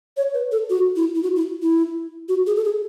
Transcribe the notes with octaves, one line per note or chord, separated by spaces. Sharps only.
C#5
B4
A4
F#4
E4
E4
F#4
E4
E4
F#4
G#4
A4
G#4